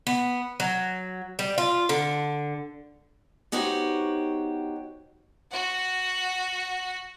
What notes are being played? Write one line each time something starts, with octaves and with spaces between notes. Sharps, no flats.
B3
F#3
G3
F4
D3
B3 D#4 F#4 G4 C5 C#5
F#4 F#5